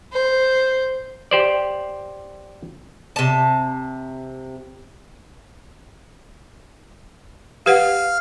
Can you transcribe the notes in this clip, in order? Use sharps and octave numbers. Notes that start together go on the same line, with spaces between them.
C5
G4 C5 D5
C3 A5
G4 B4 F5 F#5